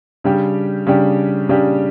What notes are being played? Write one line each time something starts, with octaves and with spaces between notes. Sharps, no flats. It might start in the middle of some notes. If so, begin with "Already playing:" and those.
C#3 G3 D4 G4
C#3 G3 D4 G4
C#3 G3 D4 G4